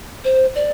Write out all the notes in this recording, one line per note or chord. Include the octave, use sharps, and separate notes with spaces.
C5
D5